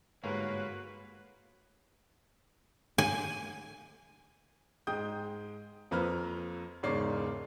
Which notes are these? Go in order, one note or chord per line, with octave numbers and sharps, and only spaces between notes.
G1 G#2 A#3 F#4 A#4 B4 C#5
G#5
G#2 G#3 G5 D#6 G6
F2 F3 A#3 B4 A#5 F6
E1 G#2 C#3 C#5 D5 C7